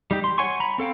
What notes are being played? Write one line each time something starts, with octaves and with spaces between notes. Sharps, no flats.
G3 D#4 G4
C6
C#5 F#5 G#5 C6 C#6
A#5 B5
C4 A4 F5 G5